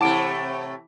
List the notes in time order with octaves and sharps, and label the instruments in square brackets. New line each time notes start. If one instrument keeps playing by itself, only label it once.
[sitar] A2 C3 A3 [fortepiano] E3 [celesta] F#5 D6 D7 [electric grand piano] A5